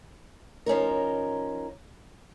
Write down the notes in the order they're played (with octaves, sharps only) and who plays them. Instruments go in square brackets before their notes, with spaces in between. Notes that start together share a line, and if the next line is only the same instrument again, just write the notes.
[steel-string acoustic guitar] F3 C#4 D#4 A#4